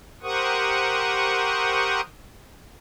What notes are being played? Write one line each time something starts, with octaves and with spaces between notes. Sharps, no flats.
G4 A#4 C5 F#5 C#6 D#6